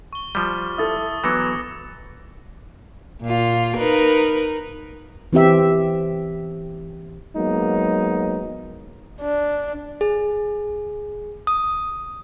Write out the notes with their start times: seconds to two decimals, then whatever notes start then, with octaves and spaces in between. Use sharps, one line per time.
0.13 C#6 G7
0.35 F3 G3
0.78 E4 A4 D#6 A6
1.24 E3 F#3 B3 D6 A#6 C#7
3.22 A#2 F4
3.77 D#4 A#4 B4
5.33 E3 C4 G4 E5
7.36 F#3 G#3 A#3 B3 D#4
9.22 D4
10.01 G#4
11.47 D#6